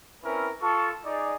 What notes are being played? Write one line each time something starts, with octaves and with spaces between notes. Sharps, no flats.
C4 C#4 E4 A#4 B4
F4 A4 A5 C#6
D#4 G#4 D5